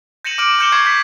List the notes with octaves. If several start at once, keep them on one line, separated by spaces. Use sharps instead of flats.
G6 A#6 C#7 D#7 E7 F#7
D6 F6 D7 F#7
D6 F6 G6 C#7 E7 G7
C#6 G#6 C7
C#6 G6 B6